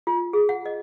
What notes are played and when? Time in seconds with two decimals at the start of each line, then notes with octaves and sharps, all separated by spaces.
0.07 F4
0.33 G#4
0.49 F#5
0.66 D#5